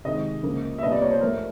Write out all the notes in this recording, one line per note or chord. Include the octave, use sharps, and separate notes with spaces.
C3 D#3 G#3 D#5
C#2 C#3 F3 A#3
E5
C2 A#2 G3 B3 D#5
D5
C#5
C5
A2 F3 A3 A#4